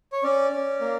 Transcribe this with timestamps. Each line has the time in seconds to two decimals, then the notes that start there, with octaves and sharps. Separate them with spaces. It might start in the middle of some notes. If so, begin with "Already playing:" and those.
0.12 C#5
0.23 C#4 D5
0.52 C#4
0.81 A#3